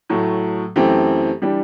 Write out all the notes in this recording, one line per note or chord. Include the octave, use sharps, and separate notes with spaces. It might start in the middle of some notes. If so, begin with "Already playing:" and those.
A2 F#3 A3
F#2 E3 A3 C4 G4
E3 G3 D4 G4